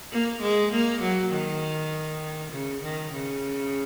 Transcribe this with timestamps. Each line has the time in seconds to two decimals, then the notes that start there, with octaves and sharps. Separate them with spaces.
0.12 A#3
0.42 G#3
0.72 A#3
1.02 F#3
1.32 D#3
2.52 C#3
2.83 D#3
3.13 C#3